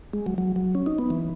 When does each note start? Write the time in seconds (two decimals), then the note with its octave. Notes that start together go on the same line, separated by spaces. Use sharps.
0.13 G#3
0.26 F#3
0.38 F#3
0.56 F#3
0.75 C#4
0.86 D#4
0.98 B3
1.10 E3